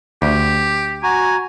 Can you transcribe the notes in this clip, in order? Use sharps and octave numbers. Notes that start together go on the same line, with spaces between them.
D2 G4
F#4 G#5 A#5